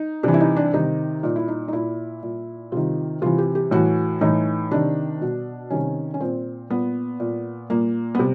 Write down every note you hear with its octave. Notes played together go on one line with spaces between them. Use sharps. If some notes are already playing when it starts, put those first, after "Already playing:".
Already playing: D#4
C3 E3 D4
E4
D#4
D4
C3 D#3 D#4
A#2 D#4
E4
D#4
D#4
A#2 E4
A#2
C3 D#3 F4
C3 E3 F4
G4
G4
A2 E3 F#4
A2 E3 D#4
C3 D#3 D4
B2
C3 D#3 C#4
C#4
A#2 C4
A#2 B3
A#2
A#2 A#3
B3
C3